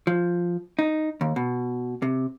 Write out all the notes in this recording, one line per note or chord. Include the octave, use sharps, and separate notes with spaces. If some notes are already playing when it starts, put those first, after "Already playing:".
F3
D#4
D#2
B2
C3